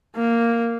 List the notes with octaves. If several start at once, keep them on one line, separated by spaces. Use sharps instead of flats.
A#3